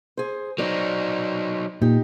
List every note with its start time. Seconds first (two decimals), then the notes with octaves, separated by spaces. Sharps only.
0.17 G#4 C5
0.58 F#3 D#4 C5 D5
1.82 A#2 D#4 G4